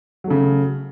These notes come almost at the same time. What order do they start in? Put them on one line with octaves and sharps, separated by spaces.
F#3 A3 C#3